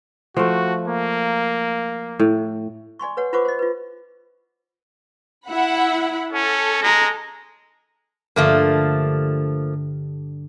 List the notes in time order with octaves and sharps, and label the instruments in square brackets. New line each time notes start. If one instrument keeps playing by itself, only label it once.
[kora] F3 A3 [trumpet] F#4
[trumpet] A#3
[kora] A2
[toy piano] D5 G#5 C6 C#6
B4 C#5 F#5
F4 B4 C5 F#5 C#6 D6
C5 D#5
F4 B4
[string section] E4 F#5 B5
[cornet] C#4 [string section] A4
[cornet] G#3 [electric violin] A#5 A#6
[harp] G2 D3 G3 [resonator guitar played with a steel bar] F3 A3 A#3